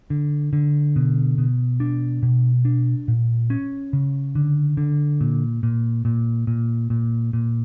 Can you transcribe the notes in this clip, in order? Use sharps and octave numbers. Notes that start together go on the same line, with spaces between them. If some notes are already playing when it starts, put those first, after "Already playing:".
D3
D3
B2
B2
D4
B2
D4
A#2
C#4
C#3
D3
D3
A#2
A#2
A#2
A#2
A#2
A#2